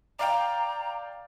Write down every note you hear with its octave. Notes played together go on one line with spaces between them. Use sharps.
D5 F5 G5 A#5